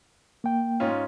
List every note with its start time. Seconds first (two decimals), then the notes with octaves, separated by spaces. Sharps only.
0.44 A#3 G5
0.80 G#2 C#4 F4